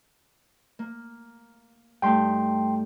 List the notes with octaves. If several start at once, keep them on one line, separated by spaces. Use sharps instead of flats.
A#3
G2 A3 D#4 G5 C6